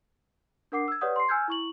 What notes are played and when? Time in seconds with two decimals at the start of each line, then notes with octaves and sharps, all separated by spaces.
0.72 D4 A#4 F#5 D6 C7
0.88 E6 G#6
1.01 G4 B4 C#5 D5 F#5 D#6
1.16 C6 C7
1.29 G#5 E6 F6 G6 G#6
1.48 E4 C#6 F#7